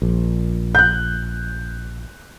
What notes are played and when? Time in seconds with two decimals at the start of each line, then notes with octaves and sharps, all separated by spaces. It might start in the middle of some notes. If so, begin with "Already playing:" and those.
0.02 A#1
0.75 F#6 G6